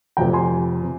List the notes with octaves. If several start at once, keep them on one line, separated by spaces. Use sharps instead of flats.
F1 F2 C3 G5 A#5
G#5 C6
C3